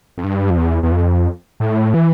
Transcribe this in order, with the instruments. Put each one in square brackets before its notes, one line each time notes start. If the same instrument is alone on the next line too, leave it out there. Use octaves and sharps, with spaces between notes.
[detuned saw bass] F2
G2
F2
E2
E2
F2
A2
E3